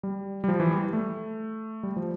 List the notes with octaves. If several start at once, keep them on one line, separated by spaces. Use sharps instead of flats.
G3
G3
F3
E3
G3
A3
G3
F3